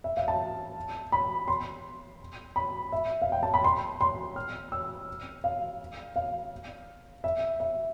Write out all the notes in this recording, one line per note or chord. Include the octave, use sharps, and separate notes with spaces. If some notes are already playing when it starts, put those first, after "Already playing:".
E5
F5
A5
B5
C6
B5
E5
F5
G5
A5
B5
C6
C6
F6
E6
F5
F5
E5
E5